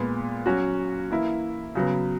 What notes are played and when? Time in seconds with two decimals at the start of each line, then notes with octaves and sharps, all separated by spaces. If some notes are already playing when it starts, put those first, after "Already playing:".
Already playing: A#2 G#3 B3
0.46 F#3 C#4 F#4
1.10 E3 A#3 E4
1.75 C#3 F#3 B3